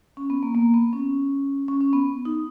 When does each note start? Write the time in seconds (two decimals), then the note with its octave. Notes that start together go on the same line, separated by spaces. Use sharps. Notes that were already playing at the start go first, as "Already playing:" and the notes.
0.17 C#4
0.30 B3
0.43 A#3
0.55 A#3
0.74 B3
0.93 C#4
1.68 C#4
1.81 C#4
1.93 B3
2.25 D#4